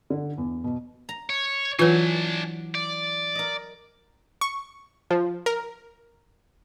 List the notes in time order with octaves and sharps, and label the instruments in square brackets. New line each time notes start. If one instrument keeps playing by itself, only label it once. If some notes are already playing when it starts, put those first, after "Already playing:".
[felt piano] D3
E2
B2
[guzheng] A#5
[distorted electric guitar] C#5
[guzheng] E3 F#3 [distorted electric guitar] D4 G#5 [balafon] F4 B4
[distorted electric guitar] D5
[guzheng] A#4 D#5
[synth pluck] C#6
F3
A#4